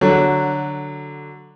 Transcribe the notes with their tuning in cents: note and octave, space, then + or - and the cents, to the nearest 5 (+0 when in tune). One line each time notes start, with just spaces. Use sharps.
D3 +0 F#3 +0